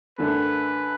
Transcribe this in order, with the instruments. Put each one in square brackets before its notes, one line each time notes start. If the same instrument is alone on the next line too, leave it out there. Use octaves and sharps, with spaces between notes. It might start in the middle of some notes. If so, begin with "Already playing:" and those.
[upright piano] F#2 D3 A3 [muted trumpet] B4